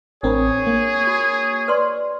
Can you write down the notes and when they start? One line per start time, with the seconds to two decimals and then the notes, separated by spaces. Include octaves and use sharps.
0.23 A1 C4 D4 G#4 A#4 C#5 B5
0.67 A#3
1.07 F#4
1.68 B4 D5 C6